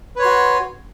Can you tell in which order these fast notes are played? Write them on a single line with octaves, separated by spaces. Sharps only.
B4 C#5 C6 F#4